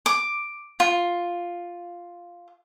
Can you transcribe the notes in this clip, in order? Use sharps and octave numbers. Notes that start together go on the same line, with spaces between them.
D6
F4